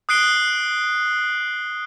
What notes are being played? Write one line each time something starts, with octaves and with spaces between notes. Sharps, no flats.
D#6 F#6 C7 D7 G7